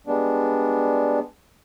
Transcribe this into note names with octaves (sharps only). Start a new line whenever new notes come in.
G3 G#3 B3 D4